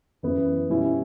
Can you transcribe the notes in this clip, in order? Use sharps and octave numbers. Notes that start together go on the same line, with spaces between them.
F#2 E3 B3 E4
B2 G3 C#4 E4